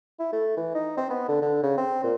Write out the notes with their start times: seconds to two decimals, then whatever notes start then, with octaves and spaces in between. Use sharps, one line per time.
0.19 E4
0.33 A3
0.57 E3
0.74 D#4
0.97 C4
1.10 B3
1.29 D3
1.42 D3
1.63 C#3
1.77 C4
2.04 A#2